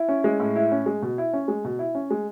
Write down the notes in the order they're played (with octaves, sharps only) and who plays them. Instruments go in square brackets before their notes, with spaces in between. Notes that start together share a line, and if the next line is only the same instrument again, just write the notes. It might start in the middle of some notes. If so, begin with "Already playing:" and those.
Already playing: [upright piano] E4
C#4
G#3
A2
E4
C#4
G#3
B2
E4
C#4
G#3
B2
E4
C#4
G#3